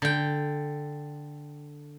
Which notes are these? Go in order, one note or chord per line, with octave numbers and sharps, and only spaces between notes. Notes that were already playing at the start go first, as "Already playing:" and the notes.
D3 G5